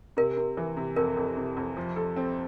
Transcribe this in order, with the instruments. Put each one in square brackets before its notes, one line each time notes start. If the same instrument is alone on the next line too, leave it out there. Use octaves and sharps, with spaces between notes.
[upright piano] C3 [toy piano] A#4
[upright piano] C3
E3
C3
[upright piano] F2 [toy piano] A#4
[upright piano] F2
C3
F2
F3
A4
C4